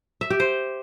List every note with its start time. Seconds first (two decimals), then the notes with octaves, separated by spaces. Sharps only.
0.21 E5
0.30 G4
0.40 C5